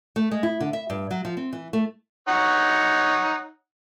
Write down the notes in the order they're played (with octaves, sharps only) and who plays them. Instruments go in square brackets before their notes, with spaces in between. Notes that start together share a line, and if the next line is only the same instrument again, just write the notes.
[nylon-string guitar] A3
G#3
E4
D3
E5
G2
F#3
F3
C4
E3
A3
[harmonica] D#4 C#5 F#5